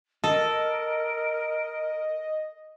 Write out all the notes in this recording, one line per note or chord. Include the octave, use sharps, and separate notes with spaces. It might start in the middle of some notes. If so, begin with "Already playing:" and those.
A4 A#4 D#5